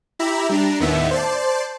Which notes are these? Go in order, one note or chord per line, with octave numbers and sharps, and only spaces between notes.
E4 G4 E5 A#5 B5
G3 D4 A#5
D#2 A2 D#3 B3 E5
C5 D5 A5